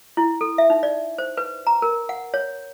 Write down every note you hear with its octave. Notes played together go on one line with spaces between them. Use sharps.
E4
A4
E5
D#4
D5
C5
B4
A#5
A#4
F#5
C#5